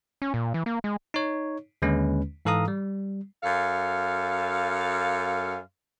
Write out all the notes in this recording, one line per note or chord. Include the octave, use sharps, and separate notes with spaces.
C#4
A#2
E3
A#3
G#3
D#4 C#5
D#2 D3 G#3 C#4 B4
G#2 E3 A4 F5 A#5 D#6
G3
F#2 A4 F5